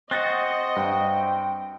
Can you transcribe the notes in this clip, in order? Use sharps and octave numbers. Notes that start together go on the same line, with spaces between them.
C4 F#4 D#5 F#6 A6 A#6
G2 G5